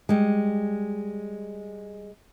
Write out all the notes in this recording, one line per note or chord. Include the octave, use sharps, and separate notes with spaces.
G3 G#3